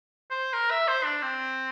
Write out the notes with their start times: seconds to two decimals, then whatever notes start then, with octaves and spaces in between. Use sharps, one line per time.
0.31 C5
0.53 A#4
0.71 E5
0.88 C5
1.04 D4
1.22 C4